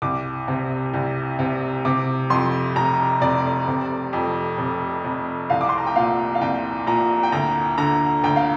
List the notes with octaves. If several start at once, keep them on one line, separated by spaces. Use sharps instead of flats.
C2 D6
C3
C2
C3
C3 D6
F2 C6
F1 A#5
F1 D5
C3
F2
F1
F1
C2 F5
D6
C6
A#5
G5
A#2 F5
F5
C2 G5
A#2 A#5
G5
D2 A#5
D3 A#5
D2 G5
F5